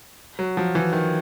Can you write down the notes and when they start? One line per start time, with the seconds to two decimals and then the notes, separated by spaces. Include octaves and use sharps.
0.39 F#3
0.57 F3
0.75 E3
0.93 D#3